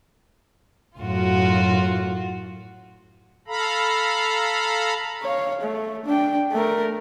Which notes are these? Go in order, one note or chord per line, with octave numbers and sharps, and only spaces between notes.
F#2 A2 F4 F#4
A4 F5 A#5 B5
C#5 F5
A3
D4 G5
A3 A#4